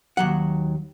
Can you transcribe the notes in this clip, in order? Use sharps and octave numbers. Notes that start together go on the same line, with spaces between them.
D#2 F#3 F#5